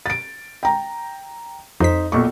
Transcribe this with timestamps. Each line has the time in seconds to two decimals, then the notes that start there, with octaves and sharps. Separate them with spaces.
0.06 A6 D7
0.63 G5 A#5
1.80 F2 D#4 C5 B6
2.12 B1 A#2 C#6